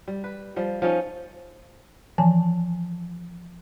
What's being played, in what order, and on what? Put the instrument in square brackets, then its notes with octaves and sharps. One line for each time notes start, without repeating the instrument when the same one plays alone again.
[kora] G3
B4
F3 G3
F3 C#4 D#4
[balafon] E3 F3 G#5 A5